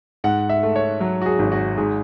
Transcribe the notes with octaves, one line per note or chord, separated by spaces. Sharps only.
G#2 F#5
E5
A3
C#5
F#3
F#4
G#4
G#1
F#4
G#2 G#4